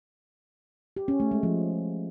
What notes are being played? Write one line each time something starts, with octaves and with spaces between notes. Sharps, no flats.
G4
C#4
A3
G#3
F3